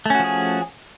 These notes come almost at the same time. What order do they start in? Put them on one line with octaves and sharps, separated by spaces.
A3 C#4 F#4 F3 G#4